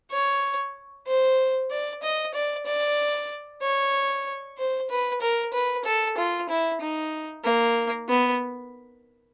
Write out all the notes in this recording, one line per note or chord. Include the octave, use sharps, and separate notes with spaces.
C#5
C5
D5
D#5
D5
D5
C#5
C5
B4
A#4
B4
A4
F4
E4
D#4
A#3
B3